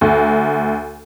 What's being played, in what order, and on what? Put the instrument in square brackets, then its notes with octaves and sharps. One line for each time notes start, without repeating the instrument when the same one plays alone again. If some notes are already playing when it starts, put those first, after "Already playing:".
[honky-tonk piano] D2